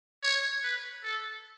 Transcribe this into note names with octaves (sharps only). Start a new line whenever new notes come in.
C#5
B4
A4